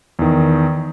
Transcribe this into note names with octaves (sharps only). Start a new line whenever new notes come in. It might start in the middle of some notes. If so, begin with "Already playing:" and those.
E2 D#3